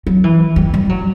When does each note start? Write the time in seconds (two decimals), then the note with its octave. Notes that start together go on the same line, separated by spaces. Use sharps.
0.07 F#3
0.24 E3
0.56 G3
0.74 G3
0.89 F#3